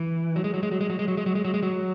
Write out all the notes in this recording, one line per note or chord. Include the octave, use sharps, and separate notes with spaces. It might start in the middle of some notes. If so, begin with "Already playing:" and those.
Already playing: E3
F#3
G#3
F#3
G#3
F#3
G#3
F#3
G#3
F#3
G#3
F#3
G#3
F#3
G#3
F#3